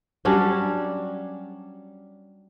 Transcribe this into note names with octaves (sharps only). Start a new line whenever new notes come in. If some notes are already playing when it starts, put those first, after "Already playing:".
F#3 G3 C#4 D4